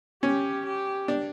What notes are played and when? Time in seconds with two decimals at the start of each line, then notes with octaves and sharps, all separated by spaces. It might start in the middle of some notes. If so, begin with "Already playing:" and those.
0.22 C#4 G4
0.66 G4
1.08 D4